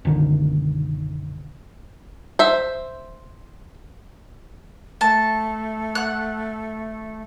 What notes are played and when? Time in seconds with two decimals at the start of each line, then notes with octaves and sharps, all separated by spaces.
0.05 F#1 B1 D3 D#3
2.39 C5 E5
5.01 A3 A5
5.95 F#5 F#6